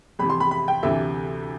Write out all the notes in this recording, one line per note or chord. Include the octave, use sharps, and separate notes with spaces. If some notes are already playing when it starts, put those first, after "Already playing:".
F2 C3 E3 B5
C6
B5
B5
G5
D2 C3 E3 E5